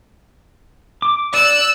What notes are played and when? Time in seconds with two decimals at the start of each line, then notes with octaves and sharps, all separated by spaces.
1.02 D6
1.34 D5 E6 F#6